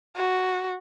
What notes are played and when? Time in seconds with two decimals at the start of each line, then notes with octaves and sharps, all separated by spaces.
0.17 F#4